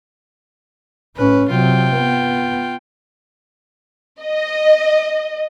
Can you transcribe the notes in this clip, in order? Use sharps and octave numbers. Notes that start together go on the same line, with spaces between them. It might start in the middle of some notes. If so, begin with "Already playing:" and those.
A2 C#4 B4
C3 F#3 F4 G5
B3
D#5